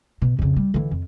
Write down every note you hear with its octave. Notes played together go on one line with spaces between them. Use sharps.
B2
F2 C#3
G3
D3 E3
F2